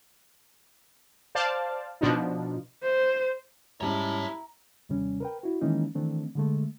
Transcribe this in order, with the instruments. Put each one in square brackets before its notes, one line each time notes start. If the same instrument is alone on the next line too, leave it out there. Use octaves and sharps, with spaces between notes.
[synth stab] C5 D5 F5 A5
B2 F3 D4 D#4
[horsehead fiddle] C5
[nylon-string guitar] G#2 G3 C#4 [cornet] E4 [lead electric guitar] C#5 A5 [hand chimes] A#5
[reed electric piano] D#2 C3 G3 C#4
A#4 B4 G5
E4 F#4
D#3 E3 G#3 A#3 C#4 D#4
D#3 E3 A3 C4 D4
D3 G#3 A3